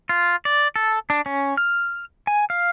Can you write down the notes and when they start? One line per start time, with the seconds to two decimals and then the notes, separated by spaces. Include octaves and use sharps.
0.09 F4
0.45 D5
0.76 A4
1.10 D4
1.26 C#4
1.57 F6
2.27 G#5
2.50 F5